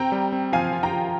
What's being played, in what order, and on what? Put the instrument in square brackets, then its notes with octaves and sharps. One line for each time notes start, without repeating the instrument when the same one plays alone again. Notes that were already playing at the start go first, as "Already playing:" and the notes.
Already playing: [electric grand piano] C4 [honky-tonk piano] G5 A#5
[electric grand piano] G3
C4
[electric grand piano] F3 [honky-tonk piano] F5 G#5
[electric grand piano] F4
[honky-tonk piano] G5 A#5
[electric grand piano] F3